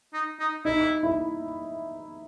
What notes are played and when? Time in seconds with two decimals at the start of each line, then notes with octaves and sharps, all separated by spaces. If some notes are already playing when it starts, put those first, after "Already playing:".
0.13 D#4
0.40 D#4
0.65 D#4 E4
1.03 E4